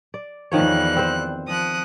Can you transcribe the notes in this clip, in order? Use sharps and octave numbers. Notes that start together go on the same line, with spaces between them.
D5
E2 D#3 F3 G3 C#5 F#6
C4 C5
F3 D#6 F#6